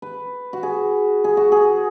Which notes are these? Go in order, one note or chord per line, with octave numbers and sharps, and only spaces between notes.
B4
F#4
G#4
G#4
F#4
G#4